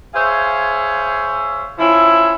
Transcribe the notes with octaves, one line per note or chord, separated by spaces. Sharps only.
G#4 C5 C#5 E5 F5
F3 C#4 E4